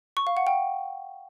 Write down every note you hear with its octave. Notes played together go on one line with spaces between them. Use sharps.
C#6
F5
F#5
G5